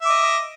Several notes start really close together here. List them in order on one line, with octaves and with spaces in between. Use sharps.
E5 D6 D#5